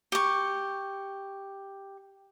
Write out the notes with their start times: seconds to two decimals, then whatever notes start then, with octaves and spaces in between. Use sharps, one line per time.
0.12 G4 C#6